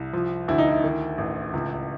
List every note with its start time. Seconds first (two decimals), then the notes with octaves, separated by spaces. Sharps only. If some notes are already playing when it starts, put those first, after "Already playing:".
Already playing: C2
0.13 F3
0.48 D2 E4
0.58 D#4
0.69 E4
0.84 D#3
1.18 A1
1.53 C#2